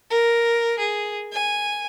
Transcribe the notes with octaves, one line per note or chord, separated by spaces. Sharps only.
A#4
G#4
G#5